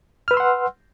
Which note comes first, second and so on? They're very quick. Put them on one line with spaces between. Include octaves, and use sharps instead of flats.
F6 B4 E6 C6 F#5